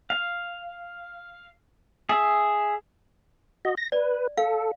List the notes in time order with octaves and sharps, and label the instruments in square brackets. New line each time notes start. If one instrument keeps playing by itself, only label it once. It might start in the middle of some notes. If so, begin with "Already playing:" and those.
[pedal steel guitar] F5
G#4 E5
[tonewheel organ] F#4 D#5
A#6
[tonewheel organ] B4 [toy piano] D5
[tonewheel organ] A4 [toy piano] F5